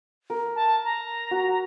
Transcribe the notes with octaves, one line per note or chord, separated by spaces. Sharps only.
A#4
A5
A#5
F#4